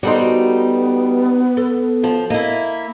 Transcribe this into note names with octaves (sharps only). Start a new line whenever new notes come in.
G3 B3 D#4 F#4 A4 C5
A4
F3
A#3 E4 D#5